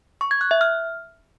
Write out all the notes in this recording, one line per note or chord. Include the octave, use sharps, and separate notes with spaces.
C#6
G#6
F#6
E5
F6